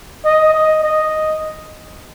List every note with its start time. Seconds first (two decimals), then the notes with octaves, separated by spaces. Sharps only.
0.25 D#5
0.54 D#5
0.83 D#5